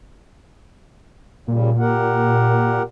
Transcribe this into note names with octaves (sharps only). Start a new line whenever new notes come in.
A#2 C#3 G3
G4 A#4 F#5